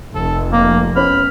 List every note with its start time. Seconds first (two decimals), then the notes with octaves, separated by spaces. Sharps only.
0.15 F1 A4
0.52 A#3 A#4
0.96 B3 C#4 C5 B5 F6